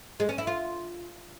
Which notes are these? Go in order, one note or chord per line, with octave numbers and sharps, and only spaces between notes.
G#3
C#4
E4
F4